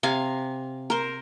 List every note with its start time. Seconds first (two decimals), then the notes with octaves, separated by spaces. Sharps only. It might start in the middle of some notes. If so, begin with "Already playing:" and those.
0.03 C3 F5 G#5
0.90 A#4 C5